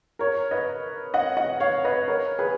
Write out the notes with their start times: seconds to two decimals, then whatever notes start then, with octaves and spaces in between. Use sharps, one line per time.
0.19 A#4 C#5
0.51 B4 D#5
1.14 D#5 F#5
1.37 D#5 F#5
1.60 C#5 F5
1.84 B4 D#5
2.08 A#4 C#5
2.39 G#4 B4